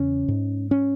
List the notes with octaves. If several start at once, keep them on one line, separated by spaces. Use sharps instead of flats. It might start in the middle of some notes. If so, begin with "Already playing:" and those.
Already playing: E2 C#3 C#4
G#2
C#4